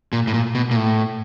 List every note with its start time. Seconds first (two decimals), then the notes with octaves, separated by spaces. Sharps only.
0.13 A#2
0.27 A2
0.34 A#2
0.55 B2
0.71 A#2
0.76 A2